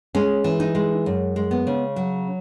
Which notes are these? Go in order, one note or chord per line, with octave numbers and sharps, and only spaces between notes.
G#3 C#4
E3
D#4
G#3
F#2
G#3
B3
C#3
F#3